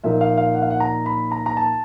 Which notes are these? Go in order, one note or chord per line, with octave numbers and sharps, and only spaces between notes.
A#2 F3 A#3 D#4 E5
F5
F5
F#5
F5
F#5
A#5
B5
A#5
A#5
A5